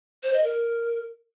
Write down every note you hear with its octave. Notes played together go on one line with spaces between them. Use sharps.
C5
D#5
A#4